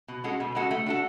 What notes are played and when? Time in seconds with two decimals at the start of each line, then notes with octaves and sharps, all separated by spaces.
0.08 B2
0.24 G#3 C#4 F#4 A4
0.40 B2
0.55 G#3 C#4 F#4 A4
0.71 A3
0.86 D4 F#4 A4